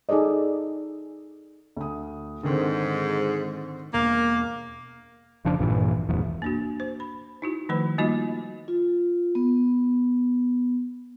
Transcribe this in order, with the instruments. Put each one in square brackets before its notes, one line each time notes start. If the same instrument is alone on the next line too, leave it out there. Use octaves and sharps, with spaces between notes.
[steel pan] D#4 G#4 A4 D5 D#5
[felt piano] D2 D#6
[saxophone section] G#2 [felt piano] D3 D#3 C4
[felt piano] E1 [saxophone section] A#3
[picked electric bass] F1 C#3 F3 D4
A#1 G2 A#2 E3
E1 A#1 E2
[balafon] A#3 D4 F#4
C5
B5
D#4 E4 F#4
D#3 F3 A3 B4 B5
G3 A#3 D#4 F4 F#4 D#5
[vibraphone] F4
B3